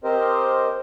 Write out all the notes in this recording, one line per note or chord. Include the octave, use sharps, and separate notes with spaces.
C4 G4 A#4 C5 D#5